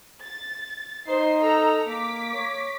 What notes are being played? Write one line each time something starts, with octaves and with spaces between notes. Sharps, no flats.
A6
D#4 C5 C7
A4 A#5 E6
A#3 D6 B6
C#5